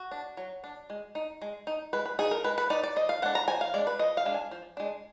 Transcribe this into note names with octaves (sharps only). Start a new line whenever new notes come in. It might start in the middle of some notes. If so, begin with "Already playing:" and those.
Already playing: F#4
D4
F#3
D4
G#3
D#4
G#3
D#4
G#3 B4
B4
D#4 G#4
A#4
G#3 B4
B4
D#4 D5
D5
F3 D#5
F5
G#3 D4 F#5
A#5
F3 G#5
F5
G#3 D4 D5
B4
F3 D#5
F5
G#3 D4
G#5
F3
G#3 D4